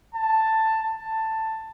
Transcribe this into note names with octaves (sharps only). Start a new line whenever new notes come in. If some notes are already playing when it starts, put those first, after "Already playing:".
A5
A5